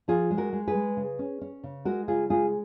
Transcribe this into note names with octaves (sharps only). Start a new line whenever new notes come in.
F3 F4 G#4
G#3
F#4 A#4
G#3
G#4 B4
G#3
C#3
C#4
C#4
C#3
G#3 F#4 A#4
C#3 F4 G#4
G#3 F4 G#4